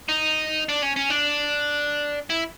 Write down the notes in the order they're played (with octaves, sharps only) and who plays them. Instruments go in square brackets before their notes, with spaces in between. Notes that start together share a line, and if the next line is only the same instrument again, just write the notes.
[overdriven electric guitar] D#4
D4
C#4
C#4
D4
E4